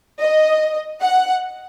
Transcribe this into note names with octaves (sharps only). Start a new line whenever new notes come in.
D#5
F#5